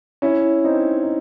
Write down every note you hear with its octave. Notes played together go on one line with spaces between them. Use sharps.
C#4 E4
C4 D#4
D#4